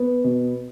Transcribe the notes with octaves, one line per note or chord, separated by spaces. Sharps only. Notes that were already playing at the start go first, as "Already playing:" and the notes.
Already playing: B3
B2